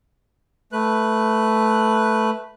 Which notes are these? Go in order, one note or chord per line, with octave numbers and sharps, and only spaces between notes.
A3 B4 F#6